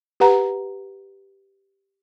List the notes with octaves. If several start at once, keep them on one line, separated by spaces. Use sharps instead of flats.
G4 B4 F#5 A#5